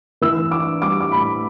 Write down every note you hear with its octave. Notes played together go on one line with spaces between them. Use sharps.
E3 E6
D4 D6
G3 D6
D6
A2 B5